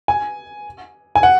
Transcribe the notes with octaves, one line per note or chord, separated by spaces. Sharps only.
G#5
G#5
F#5